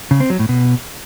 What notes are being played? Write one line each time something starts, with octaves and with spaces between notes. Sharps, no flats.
C#3
C4
F#3
A2
B2